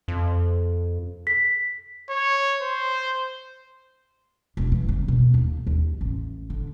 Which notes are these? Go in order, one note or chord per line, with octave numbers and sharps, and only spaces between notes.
F2
B6
C#5
C5
E1
E3
C#3
B2
D#2
D#2
A1
D3